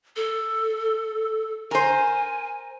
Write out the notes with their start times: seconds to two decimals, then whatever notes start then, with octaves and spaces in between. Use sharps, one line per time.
0.16 A4
1.71 A#4 C5 G#5